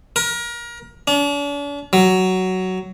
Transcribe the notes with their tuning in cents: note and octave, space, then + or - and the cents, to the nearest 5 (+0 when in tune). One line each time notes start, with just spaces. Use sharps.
A#4 +30
D4 -45
F#3 +10